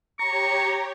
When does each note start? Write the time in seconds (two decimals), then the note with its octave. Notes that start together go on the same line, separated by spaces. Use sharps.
0.19 G4 C#5 A#5 C#6